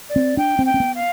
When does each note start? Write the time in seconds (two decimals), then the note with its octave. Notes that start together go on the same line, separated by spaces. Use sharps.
0.09 D5
0.16 C4
0.37 D4 G5
0.59 C4
0.66 G5
0.74 C4
0.80 B3
0.95 F5